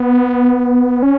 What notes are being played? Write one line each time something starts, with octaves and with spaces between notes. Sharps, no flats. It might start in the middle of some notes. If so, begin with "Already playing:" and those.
Already playing: B3
C#4